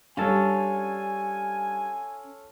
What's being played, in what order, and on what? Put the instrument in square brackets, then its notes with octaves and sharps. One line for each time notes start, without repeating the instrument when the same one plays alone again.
[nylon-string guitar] G3 D4 [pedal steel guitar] C#4 A5 [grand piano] F4 A4 C#5 [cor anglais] G#5